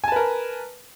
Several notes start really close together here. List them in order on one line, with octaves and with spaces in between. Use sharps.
G#5 A5 B4 A#4